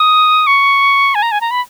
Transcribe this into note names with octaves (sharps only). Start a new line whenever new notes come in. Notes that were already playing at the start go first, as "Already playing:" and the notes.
Already playing: D#6
C#6
G#5
A#5
G#5
A#5
B5